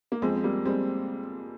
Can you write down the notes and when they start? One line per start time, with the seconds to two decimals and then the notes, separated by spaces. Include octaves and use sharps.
0.12 A#3
0.22 F2 G#3 C4
0.36 C4
0.44 G3 A#3
0.65 G3 G#3 C4